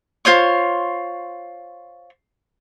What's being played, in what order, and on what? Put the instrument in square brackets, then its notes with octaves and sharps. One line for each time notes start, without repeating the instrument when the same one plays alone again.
[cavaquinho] F4 C5 C#5 C#6